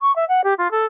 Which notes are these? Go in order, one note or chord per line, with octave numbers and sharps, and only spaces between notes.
C#6
E5
F#5
G4
F4
A4